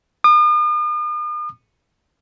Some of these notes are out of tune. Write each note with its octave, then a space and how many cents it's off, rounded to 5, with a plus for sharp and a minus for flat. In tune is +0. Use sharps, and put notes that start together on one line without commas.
D#6 -45